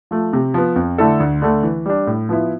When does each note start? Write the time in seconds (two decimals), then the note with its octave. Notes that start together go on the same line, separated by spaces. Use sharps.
0.11 F3 A3
0.33 C3
0.54 F3 B3
0.76 F2
0.98 D3 A3 E4 A4
1.20 D2
1.42 D3 A3
1.63 E3
1.86 G3 D4
2.07 A2
2.29 F3 B3 E4